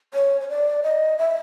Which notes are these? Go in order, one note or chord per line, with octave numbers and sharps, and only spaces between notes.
C#5
C#5
D5
D#5
E5